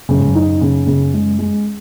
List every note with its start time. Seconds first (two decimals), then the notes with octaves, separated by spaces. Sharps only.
0.09 F#2 C#3
0.18 G#2
0.27 F#2
0.35 D#4
0.61 C#3
0.86 C#3
1.13 G#3
1.39 G#3